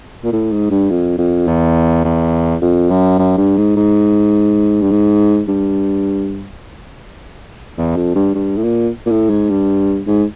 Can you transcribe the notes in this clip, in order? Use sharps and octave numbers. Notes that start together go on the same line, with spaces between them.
A#2
A2
G#2
G2
F2
F2
E2
E2
F2
F#2
F#2
G2
G#2
G#2
G2
G#2
G2
E2
F2
G2
G2
A2
A#2
A#2
A2
G#2
G2
G#2